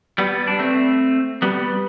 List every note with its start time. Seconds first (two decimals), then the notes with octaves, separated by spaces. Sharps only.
0.18 G3 B3
0.47 D4
0.59 A3 C4
1.42 G3 B3